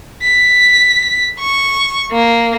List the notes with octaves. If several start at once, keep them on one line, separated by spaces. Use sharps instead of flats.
B6
C#6
A#3